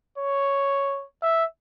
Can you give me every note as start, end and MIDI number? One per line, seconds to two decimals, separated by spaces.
0.18 1.05 73
1.22 1.44 76